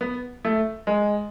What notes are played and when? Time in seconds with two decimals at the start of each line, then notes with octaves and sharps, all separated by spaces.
0.01 B3
0.45 A3
0.87 G#3